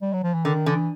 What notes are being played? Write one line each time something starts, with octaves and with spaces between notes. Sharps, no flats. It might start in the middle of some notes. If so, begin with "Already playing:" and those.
G3
F#3
F3
E3
D3 D#3
D3 E3